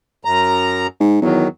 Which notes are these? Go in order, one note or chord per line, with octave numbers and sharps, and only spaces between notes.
F#2 A#5
G#2
E2 D#3 F#3